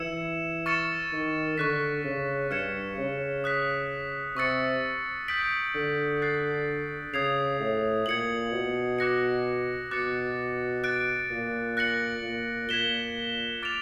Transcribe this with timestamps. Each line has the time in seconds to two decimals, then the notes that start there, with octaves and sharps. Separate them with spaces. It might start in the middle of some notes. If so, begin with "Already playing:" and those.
Already playing: E3 E6 G#6 C#7 E7
0.66 C#6 F6 A6 C#7 E7
1.12 D#3
1.58 D3 C#6 F#6 B6
2.05 C#3
2.51 G2 F6 G#6 C#7 E7
2.98 C#3
3.44 D#6 F#6 B6
4.36 C3 C#6 E6 A6 C#7
5.28 D#6 G6 B6 D7 F#7
5.75 D3
6.22 F#6 A6 C7
7.13 C#3 D#6 G#6 C7 F7
7.60 A2
8.06 A#2 G#6 C#7 F#7
8.52 B2
8.99 D6 F#6 A#6 C#7
9.91 B2 D6 F#6 A6 C#7
10.84 F#6 A6 D7
11.31 A#2
11.77 F#6 A#6 C#7 F#7
12.23 A#2
12.69 A#2 G#6 B6 E7 G7
13.62 D6 F6 A6 D7 F7